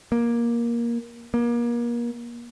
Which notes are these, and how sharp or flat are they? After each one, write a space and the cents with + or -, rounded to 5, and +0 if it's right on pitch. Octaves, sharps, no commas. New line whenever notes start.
A#3 +15
A#3 +35